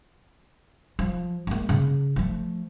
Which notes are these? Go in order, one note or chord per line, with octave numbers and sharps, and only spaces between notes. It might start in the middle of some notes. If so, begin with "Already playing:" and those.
F3
G#3 A#3
C#3
F3 A3